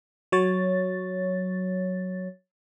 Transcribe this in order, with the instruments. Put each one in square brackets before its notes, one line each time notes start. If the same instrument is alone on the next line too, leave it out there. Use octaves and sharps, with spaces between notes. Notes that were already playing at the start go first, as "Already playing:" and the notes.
[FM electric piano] F#3 C#5 A6